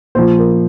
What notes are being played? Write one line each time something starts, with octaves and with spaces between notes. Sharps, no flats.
A#2 F3 C5
A#4